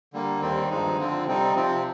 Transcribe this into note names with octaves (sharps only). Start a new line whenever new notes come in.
D3 G3 A#3
D#2 D#3 G3 C4
G2 F3 G#3 D#4
D3 F3 C4
C3 G3 C4 D#4
C3 F3 C4